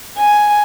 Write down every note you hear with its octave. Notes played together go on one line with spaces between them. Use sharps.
G#5